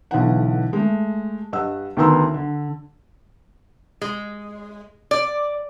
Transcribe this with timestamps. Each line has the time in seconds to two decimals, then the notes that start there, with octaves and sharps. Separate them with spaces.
0.11 B1 D3 E3 F#5
0.73 G#3 A3
1.53 G2 D#5 F#5 E6
1.97 D2 D#3 B3 A#5 C6 E6
2.34 D3
4.01 G#3
5.11 D5